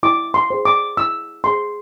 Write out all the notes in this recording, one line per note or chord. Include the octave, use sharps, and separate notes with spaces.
E4 D6
C6
G#4 C5
D6
E4 E6
G#4 C5 C6